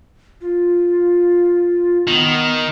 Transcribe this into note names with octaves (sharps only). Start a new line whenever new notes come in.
F4
D#3 B3